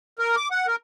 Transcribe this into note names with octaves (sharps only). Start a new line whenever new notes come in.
A#4
D6
F#5
A#4